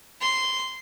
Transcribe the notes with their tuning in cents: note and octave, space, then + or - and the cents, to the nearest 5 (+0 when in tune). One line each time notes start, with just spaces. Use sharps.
C6 -10